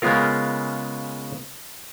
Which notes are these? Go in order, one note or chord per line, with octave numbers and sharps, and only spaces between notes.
C#3 G#3 B3 C#4 F4 A#4